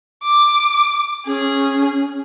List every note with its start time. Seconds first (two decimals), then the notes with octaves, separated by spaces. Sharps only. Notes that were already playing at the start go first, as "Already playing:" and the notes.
0.24 D6
1.26 C#4 G#4